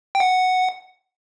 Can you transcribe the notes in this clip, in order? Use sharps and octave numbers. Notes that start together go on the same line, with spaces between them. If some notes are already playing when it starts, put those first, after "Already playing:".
G5
F#5